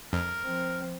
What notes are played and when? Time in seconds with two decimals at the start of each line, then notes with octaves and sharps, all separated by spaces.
0.13 F2 A#4
0.44 F3 C4